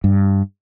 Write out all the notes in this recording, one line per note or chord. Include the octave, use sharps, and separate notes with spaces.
G2